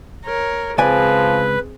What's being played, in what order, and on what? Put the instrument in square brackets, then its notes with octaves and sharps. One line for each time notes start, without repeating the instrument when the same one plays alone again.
[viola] A#4 C#5
[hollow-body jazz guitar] C#2 D5 G#5 [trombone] F3 [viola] C4 G#4 [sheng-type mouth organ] B4